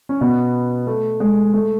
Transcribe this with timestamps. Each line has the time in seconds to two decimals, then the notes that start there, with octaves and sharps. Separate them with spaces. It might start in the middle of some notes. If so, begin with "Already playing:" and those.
0.09 C#4
0.21 B2 B3
0.87 A3
1.20 G#3
1.54 A3